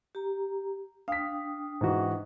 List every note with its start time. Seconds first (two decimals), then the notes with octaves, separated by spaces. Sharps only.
0.15 G4 A#5
1.08 D4 F5 G5 D#6 B6
1.81 G#2 E3 F#4